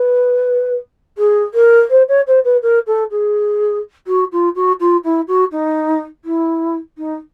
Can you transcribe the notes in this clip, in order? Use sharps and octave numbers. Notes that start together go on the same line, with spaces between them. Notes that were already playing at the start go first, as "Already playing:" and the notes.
Already playing: B4
G#4
A#4
C5
C#5
C5
B4
A#4
A4
G#4
F#4
F4
F#4
F4
E4
F#4
D#4
E4
D#4